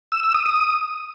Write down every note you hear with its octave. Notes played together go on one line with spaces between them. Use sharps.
E6
E6
D#6
D#6